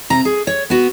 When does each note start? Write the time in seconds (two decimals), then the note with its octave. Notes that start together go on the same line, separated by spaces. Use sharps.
0.10 C3 A#5
0.25 G#4
0.47 C#5
0.70 B3 F#4